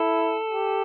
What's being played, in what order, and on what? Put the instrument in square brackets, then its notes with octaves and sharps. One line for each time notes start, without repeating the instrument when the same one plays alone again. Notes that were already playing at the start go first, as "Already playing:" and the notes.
Already playing: [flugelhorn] E4 [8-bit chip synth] A4 A5
[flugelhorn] G4